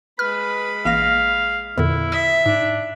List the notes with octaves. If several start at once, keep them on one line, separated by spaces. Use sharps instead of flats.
G#3 B4 B5 F6
A1 A#3 F5 A#6
E2 A#2 D3 E4
E5 E6
G#2 D4